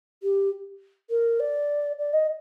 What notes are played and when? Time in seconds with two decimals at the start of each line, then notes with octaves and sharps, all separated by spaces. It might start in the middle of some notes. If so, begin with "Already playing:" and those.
0.23 G4
1.10 A#4
1.40 D5
1.99 D5
2.13 D#5